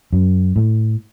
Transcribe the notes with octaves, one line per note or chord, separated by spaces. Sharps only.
F#2
A2